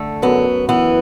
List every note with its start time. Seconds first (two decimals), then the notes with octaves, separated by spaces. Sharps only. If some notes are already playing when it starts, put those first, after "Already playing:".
Already playing: D3 A3
0.22 F#2 B3
0.69 E3 B3